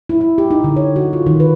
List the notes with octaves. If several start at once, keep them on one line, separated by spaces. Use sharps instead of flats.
E4
E4
G4
D#4
D3
C#5
F#4
F4
D#3
B4